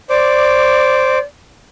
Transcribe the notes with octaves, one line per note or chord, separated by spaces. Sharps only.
C5 D5 D6